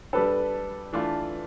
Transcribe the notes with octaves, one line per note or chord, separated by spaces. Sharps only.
G3 D4 A4 B4
E3 A3 D4 F4